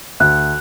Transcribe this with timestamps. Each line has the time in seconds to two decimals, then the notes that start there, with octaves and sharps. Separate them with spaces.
0.20 D2 F#6